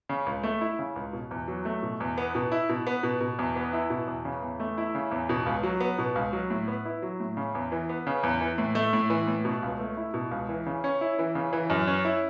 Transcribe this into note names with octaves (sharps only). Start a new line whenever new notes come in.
C#3
C#2
A3
E4
C#3
C#2
B2
E2
F#3
A3
B2
E2
B3
B2
E4
B2
B3
B2
B2
E2
B3
E4
B2
E2
C#3
E2
A3
E4
C#3
E2
B2
C#2
F#3
B3
B2
C#2
F#3
A2
B3
E4
F#3
A2
C#3
E2
E3
B3
C#3
E2
E3
A2
A3
A2
E3
A2
B2
C#2
A3
E4
B2
C#2
E3
C#3
C#4
E4
E3
C#3
E3
F#2
C#4
E4